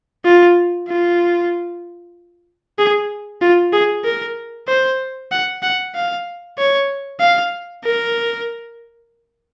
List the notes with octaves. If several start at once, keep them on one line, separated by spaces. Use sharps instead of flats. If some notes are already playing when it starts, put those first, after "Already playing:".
F4
F4
G#4
F4
G#4
A#4
C5
F#5
F#5
F5
C#5
F5
A#4